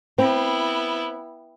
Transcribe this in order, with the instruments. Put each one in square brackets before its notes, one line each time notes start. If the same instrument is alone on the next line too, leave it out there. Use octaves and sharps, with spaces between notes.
[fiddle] B3 E4 [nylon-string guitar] C4